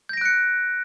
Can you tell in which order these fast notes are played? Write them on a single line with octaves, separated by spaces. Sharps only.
G6 A#6 D7 F#6 C#7